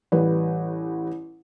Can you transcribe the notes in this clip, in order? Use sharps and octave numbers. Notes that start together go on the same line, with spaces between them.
A1 G3 B4